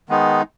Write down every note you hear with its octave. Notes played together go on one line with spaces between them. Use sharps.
D#3 G#3 B3 D#4